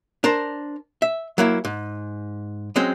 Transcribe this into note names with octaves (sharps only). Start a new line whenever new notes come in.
D4 A#4 C5 A5
E5
F#3 A#3 E4
G#2
F#3 G#3 C4 C#4